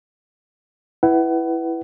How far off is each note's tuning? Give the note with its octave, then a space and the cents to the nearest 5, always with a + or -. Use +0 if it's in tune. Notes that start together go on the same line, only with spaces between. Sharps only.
E4 +5 B4 +0 F#5 +30